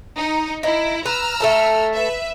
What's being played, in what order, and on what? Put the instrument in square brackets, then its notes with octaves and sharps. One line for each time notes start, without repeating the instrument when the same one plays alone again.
[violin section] D#4
[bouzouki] D#4 [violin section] E4
[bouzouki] B4 [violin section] A#5 E6 F6
[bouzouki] A3 A4 A5
[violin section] B4 E5